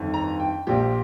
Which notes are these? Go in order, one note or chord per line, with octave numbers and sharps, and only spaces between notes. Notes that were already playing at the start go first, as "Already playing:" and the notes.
Already playing: G1 F2 D#3
A#5
G5
A#1 A#2 F3 G4